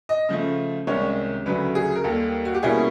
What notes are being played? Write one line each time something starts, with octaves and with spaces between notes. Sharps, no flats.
D#5
C#3 F3 A3
C2 C3 D#3 G#3 C#4 C#5
D2 C#3 F#3 A3 B4
G#4
A#4
D#2 D#3 G3 A#3 A4
F#4
G4
B2 G3 A#3 C#4 E4 G#4